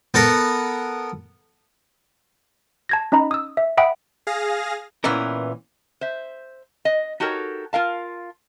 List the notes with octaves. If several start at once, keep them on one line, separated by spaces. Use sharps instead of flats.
B3 A4 A#4
A5 G#6 A#6
C#4 D#4 D#5 A#5 B5
D#6 E6
E5
E5 F#5 G5 B5 D#6 D7
G#4 F5 A#6
A#2 E3 B3 C#4 A#4
C5 E5
D#5
D#4 F#4 G4 A4 A#4 C#5
F4 A#4 F5 A5